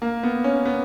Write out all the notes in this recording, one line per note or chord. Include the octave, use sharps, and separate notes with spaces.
A#3
B3
C#4
B3